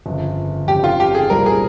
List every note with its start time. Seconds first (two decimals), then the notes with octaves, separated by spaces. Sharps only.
0.06 G1 F2 C#3
0.68 G1 F2 C#3 G4
0.84 F4
1.00 G4
1.15 G#4
1.30 C2 A#2 G3 C4 A#4
1.46 G#4